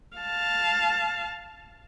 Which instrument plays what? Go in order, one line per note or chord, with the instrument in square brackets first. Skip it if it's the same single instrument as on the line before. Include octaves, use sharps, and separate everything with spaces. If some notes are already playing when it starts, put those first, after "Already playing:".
[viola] F5 A5